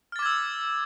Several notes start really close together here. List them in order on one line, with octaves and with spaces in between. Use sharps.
F6 A6 D6 G#6 E6